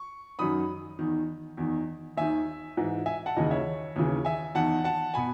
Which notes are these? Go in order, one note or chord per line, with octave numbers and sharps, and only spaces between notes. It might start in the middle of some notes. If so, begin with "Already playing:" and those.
Already playing: C#6
F#2 D#3 B5 D#6
E2 D#3
E2 D#3
D#2 D#3 E5 G#5
G#2 E3
E5 G#5
F#5 A5
D#2 C#3 E3 D#5
C#5 E5
D#2 C#3 E3
E5 G#5
E2 D#3 F#5 A5
F#5 A5
B2 G#5 B5